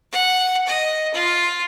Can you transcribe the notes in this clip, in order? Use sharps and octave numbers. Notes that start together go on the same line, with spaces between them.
F#5
D#5
F4